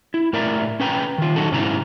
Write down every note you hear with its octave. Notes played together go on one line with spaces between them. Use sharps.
E4
A2 A#4 D5 E5 A#5
C#4 B4 G5 A#5
D#3 F4
D#3 F#3 D#4 F#4 A4
G#2 C3 C#4 E4 A#5